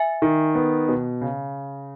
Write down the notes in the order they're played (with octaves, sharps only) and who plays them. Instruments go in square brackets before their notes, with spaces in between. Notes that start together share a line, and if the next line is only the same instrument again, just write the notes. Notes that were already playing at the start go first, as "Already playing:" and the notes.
Already playing: [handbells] E5 G#5
[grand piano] D#3
B3
B2
C#3